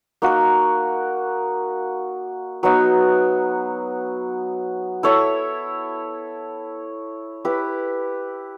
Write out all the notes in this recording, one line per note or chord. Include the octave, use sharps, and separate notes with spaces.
A#3 D#4 F#4 A#4
F#3 B3 D#4 F#4
E4 A4 C#5 E5
E4 G4 B4